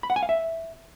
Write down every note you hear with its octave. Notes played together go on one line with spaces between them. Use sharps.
B5
F#5
G#5
F5
E5